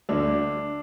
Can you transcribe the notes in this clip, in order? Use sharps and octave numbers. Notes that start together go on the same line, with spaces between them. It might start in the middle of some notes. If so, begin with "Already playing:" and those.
D2 D3 D4